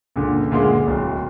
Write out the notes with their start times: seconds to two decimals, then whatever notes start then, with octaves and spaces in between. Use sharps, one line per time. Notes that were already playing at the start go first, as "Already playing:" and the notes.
0.16 C#2 A#2 D3
0.51 D2 A#2 G#3 A#3 C6
0.87 D1